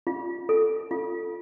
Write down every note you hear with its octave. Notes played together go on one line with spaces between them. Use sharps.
F4
A4
F4